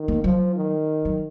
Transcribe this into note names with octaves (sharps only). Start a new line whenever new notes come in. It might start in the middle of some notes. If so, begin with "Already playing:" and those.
Already playing: D#3
A#3
F3 F#3
D#3
F#3